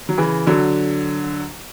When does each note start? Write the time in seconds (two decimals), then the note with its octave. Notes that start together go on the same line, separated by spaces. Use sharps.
0.09 F#3
0.18 C#3 E3
0.47 D3 F#3